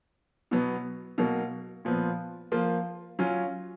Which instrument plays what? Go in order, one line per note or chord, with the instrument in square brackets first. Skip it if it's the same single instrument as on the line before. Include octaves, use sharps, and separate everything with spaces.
[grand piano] B2 F#3 B3
B2 F#3 A#3
A#2 F3 B3
F3 A#3 F4
F#3 C#4 F4